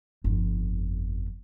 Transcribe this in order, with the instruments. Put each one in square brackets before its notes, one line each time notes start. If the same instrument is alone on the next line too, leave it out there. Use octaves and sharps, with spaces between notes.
[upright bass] G1 F2